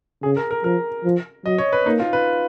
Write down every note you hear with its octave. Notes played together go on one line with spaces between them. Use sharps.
C#3 G#4
A#4
A#4
F3 A#4
F3
F#3 D#5
C#5
B4
A#3 D#4
F4
B4